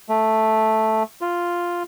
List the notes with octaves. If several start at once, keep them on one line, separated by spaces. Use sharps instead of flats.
A3
F4